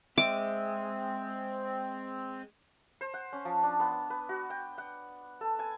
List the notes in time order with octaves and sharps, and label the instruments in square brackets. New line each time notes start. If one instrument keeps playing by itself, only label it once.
[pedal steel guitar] G#3 [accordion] C4 [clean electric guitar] E5 [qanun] D6
[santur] C5
F#5
C#4
F3
D4
B3
B4
F#4
G5
F#5
A4
G#5